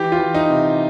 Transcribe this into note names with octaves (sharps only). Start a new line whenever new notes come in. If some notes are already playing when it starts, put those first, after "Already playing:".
Already playing: E3 G4
F4
E3
D#4
C3